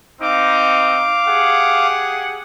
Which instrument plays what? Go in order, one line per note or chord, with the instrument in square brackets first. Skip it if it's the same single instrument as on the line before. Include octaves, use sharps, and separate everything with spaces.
[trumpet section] C4 D#4 [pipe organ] F5 D6
[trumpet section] G4 G#4 F#5